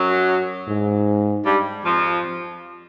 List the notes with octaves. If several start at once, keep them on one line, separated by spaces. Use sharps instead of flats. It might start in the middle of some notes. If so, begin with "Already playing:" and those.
Already playing: F#2 F#3
G#2
G2 G3
F2 F3